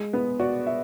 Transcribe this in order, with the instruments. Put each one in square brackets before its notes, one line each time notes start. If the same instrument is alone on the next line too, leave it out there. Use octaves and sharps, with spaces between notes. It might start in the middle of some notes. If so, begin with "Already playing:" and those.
Already playing: [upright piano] G#3
[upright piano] B3 [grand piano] B4
[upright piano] F#4 [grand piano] D5
[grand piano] E5